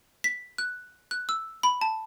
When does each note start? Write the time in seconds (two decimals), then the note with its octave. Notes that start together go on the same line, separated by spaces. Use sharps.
0.24 B6
0.58 F#6
1.11 F#6
1.29 E6
1.63 B5
1.81 A5